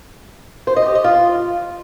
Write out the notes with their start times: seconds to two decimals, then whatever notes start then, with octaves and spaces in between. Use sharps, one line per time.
0.67 C5
0.76 D#5
0.86 G4
0.95 D#5
1.04 F4